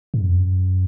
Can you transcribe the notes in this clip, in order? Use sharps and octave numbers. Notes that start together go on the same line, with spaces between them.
G#2
F#2
F2
F#2